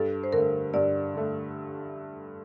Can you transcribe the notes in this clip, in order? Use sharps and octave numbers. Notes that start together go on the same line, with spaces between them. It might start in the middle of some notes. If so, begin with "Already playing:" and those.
Already playing: G2 A4
C5
D3 A3 A#4
G2 D5
D3 A3